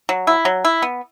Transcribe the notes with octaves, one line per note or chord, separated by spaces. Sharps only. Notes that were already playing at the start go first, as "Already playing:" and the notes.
F#3
E4
F#3
E4
B3